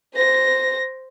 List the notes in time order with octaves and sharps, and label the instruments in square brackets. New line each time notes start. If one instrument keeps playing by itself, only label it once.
[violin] C5 A#6